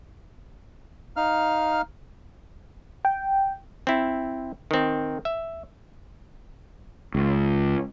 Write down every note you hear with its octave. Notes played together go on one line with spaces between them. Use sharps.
D#4 F5 F6
G5
C4 E4
D#3 C4
E5
C#2